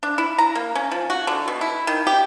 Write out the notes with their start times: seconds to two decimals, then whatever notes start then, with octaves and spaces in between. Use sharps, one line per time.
0.03 D4
0.18 E4
0.38 A#5
0.55 A#3
0.75 C#4
0.91 F3
1.10 F#4
1.27 D3
1.48 B2
1.61 E4
1.87 D#3
2.07 G4